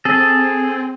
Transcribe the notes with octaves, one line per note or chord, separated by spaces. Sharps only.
C4 G#4 A4